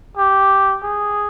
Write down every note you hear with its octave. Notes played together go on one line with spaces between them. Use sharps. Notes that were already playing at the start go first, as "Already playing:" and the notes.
G4
G#4